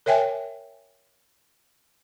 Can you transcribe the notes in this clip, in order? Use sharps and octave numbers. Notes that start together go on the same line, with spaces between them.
A#4 C#5 E5 G5 G#5